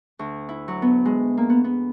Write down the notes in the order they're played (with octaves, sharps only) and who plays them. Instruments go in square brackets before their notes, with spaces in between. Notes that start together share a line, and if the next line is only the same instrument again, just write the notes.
[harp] D2
E4
F#3
B3
G#3
A#3
B3
B3